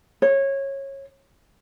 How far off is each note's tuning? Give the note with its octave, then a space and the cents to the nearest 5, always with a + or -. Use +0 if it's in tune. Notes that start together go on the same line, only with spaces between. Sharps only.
C#5 -20